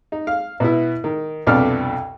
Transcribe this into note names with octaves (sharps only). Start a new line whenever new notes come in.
D#4
F5
B2 B3 E4
D#3
C2 F2 B2 D4 A4 F6